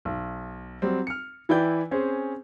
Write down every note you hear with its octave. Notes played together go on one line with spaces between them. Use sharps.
B1
F#3 G3 C4
F6 C#7
E3 E4 B4 D5 G5 G6
C4 C#4 G#4 C5